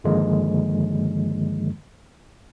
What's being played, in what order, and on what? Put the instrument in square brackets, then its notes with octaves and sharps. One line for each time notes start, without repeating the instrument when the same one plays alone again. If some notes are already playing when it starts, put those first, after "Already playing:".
[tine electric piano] G2 D3 D#3 F3 G#3 A#3